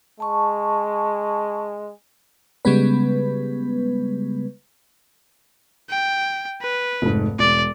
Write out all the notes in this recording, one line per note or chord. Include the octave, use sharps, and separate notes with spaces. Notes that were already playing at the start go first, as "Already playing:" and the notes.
G#3 A5 C#6
C#3 G3 G#3 B3 B4
G5
B4
F1 G#2
E1 D5